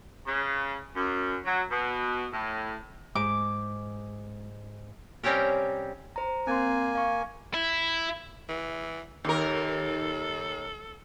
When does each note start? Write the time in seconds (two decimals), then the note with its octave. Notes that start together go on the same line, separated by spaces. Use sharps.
0.27 C#3
0.95 F#2
1.45 F#3
1.71 B2
2.32 A2
3.15 G#2 G#3 D6
5.23 C3 G3 C4 C#4 G4 A#4
6.16 C5 A#5
6.47 A#3 C4 G#5 C6
6.95 F5 C#6
7.54 E4
8.49 E3
9.25 D#2 A4 A#4